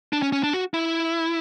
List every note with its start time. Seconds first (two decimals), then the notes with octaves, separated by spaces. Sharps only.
0.13 D4
0.22 C#4
0.32 C#4
0.43 D4
0.53 F#4
0.74 E4